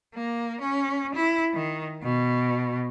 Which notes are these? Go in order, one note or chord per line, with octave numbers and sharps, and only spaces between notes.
A#3
C#4
E4
D#3
B2